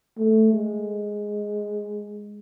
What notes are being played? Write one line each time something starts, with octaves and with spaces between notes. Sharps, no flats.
A3
G#3